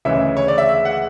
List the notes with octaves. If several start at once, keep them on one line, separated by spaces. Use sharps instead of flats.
D2 C#3 E3 G#3 C#4 E5
C#5
D5
E5
E5
F#5